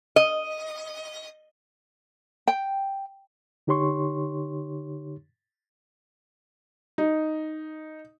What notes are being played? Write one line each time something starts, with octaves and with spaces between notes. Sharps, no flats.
D#5
G5
D3 D#4 G4 C#5 C6 C#6
D#4